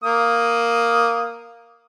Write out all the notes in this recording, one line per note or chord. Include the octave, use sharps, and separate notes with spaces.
A#3 D#6